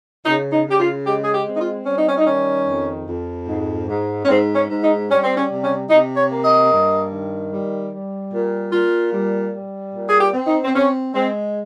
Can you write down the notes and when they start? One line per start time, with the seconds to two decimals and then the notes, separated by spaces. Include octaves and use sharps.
0.24 C#3 D#4
0.52 D#4
0.65 C#3 G4
0.79 F4
1.05 G#3 G4
1.24 G#4
1.33 G4
1.45 C4
1.55 D#4
1.60 F4
1.86 G3 C#4
1.98 D#4
2.09 C#4
2.18 D#4
2.26 D#3 C#4
2.66 F2
3.06 F2
3.47 G#2
3.87 G#2
4.23 C#4
4.28 G#2 C4
4.55 C#4
4.68 G#2
4.82 D#4
5.09 G3 C#4
5.24 C4
5.36 C#4
5.49 C3
5.63 C#4
5.89 C3 D#4
6.16 C#5
6.30 A#3
6.43 D#5
6.70 G2
7.11 D#3
7.51 G3
7.92 G3
8.32 A#2
8.72 A#2 F4
9.13 G3
9.52 G3
9.92 A#2
10.08 G#4
10.20 G4
10.33 C4
10.47 D#4
10.64 C4
10.74 C4 C#4
11.13 G#3 C4